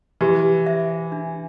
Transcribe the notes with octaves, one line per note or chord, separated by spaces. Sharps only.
E3 G4
C5 E5
D4